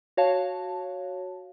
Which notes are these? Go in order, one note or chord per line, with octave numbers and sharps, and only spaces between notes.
F#4 C#5 F5 A5